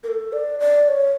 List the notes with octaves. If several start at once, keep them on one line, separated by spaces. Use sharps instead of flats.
A#4
A4
D5
D5
C#5